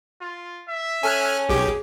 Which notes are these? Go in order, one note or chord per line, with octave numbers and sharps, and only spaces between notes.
F4
E5
C#4 A4 G#5 F6 F#6
B1 G4 G#4 D6